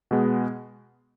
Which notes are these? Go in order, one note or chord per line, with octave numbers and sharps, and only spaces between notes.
B2 G#3 B3